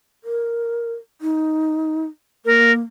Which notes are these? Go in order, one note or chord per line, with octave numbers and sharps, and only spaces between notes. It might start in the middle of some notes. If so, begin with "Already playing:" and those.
A#4
D#4
A#3 A#4